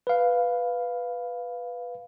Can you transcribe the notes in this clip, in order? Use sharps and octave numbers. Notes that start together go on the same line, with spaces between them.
B4 F5